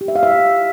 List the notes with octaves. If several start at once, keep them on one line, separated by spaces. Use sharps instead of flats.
G4
E5
F5
E5